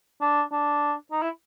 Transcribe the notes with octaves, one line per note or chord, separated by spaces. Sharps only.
D4
D4
D#4
E4